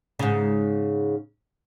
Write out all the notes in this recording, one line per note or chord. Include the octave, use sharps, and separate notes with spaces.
G#2 C#3